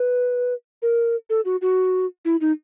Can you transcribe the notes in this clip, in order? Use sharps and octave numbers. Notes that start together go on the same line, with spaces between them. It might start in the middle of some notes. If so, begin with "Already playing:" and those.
Already playing: B4
A#4
A4
F#4
F#4
E4
D#4